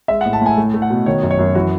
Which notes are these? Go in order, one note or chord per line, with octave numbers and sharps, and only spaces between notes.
G#3 E5
A2 F#5
A5
A2 G#5
A3
A3
F#5
B2
D#3 C#5
F#2
C#5
F#2
E3 F#4